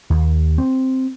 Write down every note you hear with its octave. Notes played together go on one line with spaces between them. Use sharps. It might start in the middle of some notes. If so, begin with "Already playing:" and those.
D#2
C4